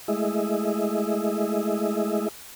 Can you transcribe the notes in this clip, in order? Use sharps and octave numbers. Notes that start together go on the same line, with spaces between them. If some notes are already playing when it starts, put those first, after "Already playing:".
G#3 A3 E4 G#4 D#5 E5